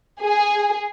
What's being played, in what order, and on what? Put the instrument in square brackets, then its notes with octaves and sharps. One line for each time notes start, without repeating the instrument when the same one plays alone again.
[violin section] G#4